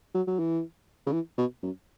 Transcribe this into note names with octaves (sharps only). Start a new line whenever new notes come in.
F#3
F#3
E3
C#3
E3
B2
F#2